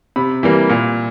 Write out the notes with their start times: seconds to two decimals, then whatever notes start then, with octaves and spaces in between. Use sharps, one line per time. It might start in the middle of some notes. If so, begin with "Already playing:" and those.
0.16 C3 B5
0.43 E3 G3 A#3
0.70 A#2